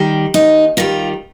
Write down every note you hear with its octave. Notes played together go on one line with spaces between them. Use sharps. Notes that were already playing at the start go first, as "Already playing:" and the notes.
Already playing: D#3 G3
D#2 D#4
D#3 G3 F4